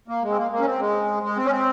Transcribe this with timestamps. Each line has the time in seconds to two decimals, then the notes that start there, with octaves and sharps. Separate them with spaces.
0.08 A#3
0.23 G#3
0.31 C4
0.37 A#3
0.51 A#3
0.59 C#4
0.65 C4
0.80 G#3
1.23 G#3
1.37 C4
1.45 C#4
1.51 C4